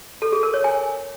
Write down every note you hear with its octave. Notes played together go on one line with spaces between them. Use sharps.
A4
G#4
A#4
C#5
G#5